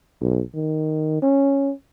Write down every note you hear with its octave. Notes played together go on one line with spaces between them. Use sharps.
B1
D#3
C#4